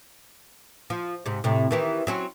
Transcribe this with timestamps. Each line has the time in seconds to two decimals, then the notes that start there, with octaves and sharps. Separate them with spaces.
0.90 F3
1.26 G#2 C3
1.44 A2 C3
1.71 D#3 E3 G4
2.07 F#3 C4 C#4